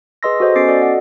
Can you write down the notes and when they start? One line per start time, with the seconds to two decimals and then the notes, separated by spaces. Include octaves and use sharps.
0.23 G#4 B4 D#5 C6 E6 A#6
0.40 F#4 A4 C5 D#5
0.55 B3 C#4 D6 A6 C7 D7
0.68 F#4 A4 D5 D#5
0.82 F#5